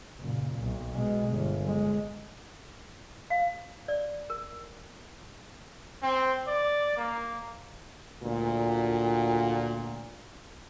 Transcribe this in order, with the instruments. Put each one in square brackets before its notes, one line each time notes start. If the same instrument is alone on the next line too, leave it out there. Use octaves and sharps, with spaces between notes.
[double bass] F#1 A#2
B1
B2 G#3
G1
G#3
[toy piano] F5
D5
A#4
[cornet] C4
D5
A#3
[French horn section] D2 A#2